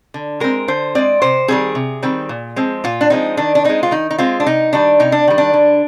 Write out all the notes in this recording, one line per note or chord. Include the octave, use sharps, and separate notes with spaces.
D3
G#3 C4 A#4
D3 C5
G#3 C4 D5
C3 C5
D#3 G3 C4 G#4
C3
D#3 G3 C4
A#2
F3 G#3 C4
A#2 F4
D4
F3 G#3 C4 D#4
D#3 D4
D4
G#3 C4 D#4
F4
D#3 D#4
D#4
G#3 C4 F4
D4
C3 D#4
D#3 G3 D4
C3 D#4
D4
D#3 G3
D4
D3